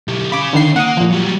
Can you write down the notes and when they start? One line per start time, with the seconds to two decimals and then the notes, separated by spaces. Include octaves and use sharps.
0.08 B1 G4
0.32 C#4 F5 B5 D6
0.53 D3 D#3 C7
0.76 A#3 A#4 F#5 D#6
0.97 A#2 F3
1.11 F#3 G3